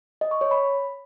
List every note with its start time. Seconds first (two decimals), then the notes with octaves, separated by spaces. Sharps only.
0.21 D#5
0.31 C#6
0.41 C#5
0.51 B5